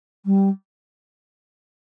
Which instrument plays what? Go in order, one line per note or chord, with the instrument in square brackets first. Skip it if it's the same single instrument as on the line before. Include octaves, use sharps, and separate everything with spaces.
[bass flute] G3